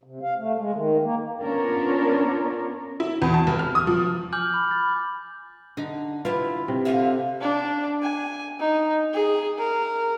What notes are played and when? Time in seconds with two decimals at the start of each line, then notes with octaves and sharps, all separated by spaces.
0.03 C3
0.23 F5
0.37 A3
0.58 G#3
0.74 D#3
1.02 A#3
1.41 B3 C#4 D4 F4 A#4 C#5
3.00 E4
3.22 E2
3.34 A5
3.47 F1
3.59 F6
3.75 D#6
3.87 F3
4.33 G#5 D6 F6 G6 F#7
4.54 B5
4.71 A6
5.77 D3 D#4
6.25 E4 F4 G4 B4
6.68 C3
6.85 D3 F4 E5
7.41 D4
8.03 G#5
8.60 D#4
9.14 G#4
9.58 A#4